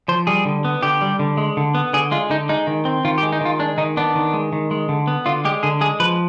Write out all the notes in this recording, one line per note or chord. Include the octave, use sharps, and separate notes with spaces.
F3 C5
G3 G#4
D3
B3
D3 G4
G3
D3
G#3
D3
B3
D3 G#4
G#3 F4
D3 D#4
G#3 D#4
D#3
C4
D#3 F4
G4
G#3
D#4
D#3 F4
G#3 D4
D#3 D#4
B3 D4
D#3
G#3
D#3
G#3
D3
B3
D3 F4
G#3 G4
D3 G#4
G#3 G#4
F3 B4